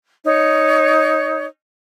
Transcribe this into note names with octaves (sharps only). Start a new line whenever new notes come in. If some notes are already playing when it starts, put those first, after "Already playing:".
D#4 C#5